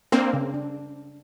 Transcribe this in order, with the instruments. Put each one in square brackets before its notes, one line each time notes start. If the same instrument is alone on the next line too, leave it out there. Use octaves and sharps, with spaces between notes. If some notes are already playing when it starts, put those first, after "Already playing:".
[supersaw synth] A#3 C4 [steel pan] D4
[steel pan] C#3
D4